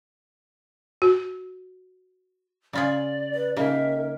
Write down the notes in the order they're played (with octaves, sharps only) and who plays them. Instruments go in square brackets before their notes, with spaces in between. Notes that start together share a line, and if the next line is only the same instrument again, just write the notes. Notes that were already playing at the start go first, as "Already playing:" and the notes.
[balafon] F#4
[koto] C#3 F4 G#4 [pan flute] D5
[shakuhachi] B4
[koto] C#3 [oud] A#3 D#4 G4 [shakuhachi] A#4 [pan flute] E5